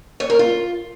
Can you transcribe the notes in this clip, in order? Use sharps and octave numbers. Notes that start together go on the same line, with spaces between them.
C#5
A#4
F4